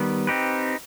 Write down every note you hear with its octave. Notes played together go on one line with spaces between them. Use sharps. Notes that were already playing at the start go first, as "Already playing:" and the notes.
Already playing: D#3 G3 B3
C4 D#4 G4 B4